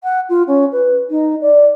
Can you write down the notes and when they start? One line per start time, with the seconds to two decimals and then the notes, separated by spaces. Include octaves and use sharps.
0.03 F#5
0.29 F4
0.47 C#4
0.72 B4
1.10 D#4
1.41 D5